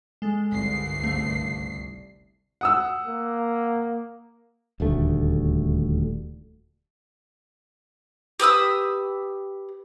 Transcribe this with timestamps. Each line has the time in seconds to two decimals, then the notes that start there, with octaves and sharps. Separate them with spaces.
0.22 G#3 A4
0.52 G1 C2 C7
1.01 C#2 A3
2.61 F#5 D#6 E6
3.07 A#3
4.80 D#1 D2 A3
8.40 G4 B4 D#6 E6